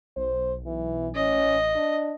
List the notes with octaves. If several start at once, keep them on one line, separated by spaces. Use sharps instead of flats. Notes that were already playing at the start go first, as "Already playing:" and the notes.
B1 C5
E3
A1 C#4 D#5
D4